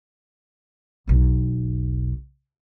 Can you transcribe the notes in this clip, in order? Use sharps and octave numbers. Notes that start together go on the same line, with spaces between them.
E1 B1